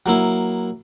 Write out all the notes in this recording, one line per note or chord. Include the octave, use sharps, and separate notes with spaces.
F#3 A#3 E4